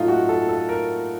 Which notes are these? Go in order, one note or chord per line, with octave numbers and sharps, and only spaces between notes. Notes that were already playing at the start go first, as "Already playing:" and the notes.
Already playing: A2 F#3 A3 D#4 F4 A4
F#4
A4
A4
A#4